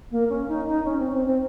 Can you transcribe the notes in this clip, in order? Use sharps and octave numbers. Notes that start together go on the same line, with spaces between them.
A#3
C#4
D#4
D#4
C#4
C4
C4
C4